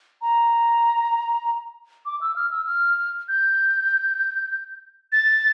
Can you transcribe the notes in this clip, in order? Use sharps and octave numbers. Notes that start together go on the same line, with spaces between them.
A#5
D6
E6
F6
E6
F6
G6
A6